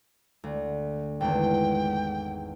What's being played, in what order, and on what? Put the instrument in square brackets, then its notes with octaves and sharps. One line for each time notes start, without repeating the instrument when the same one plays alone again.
[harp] D2
[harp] G#1 E2 [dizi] G5